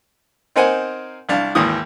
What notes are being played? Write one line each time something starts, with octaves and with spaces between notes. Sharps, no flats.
C4 D#4 A#4 C5 F#5 G#5
C2 D4 F5
G#1 D#2 E3 D#6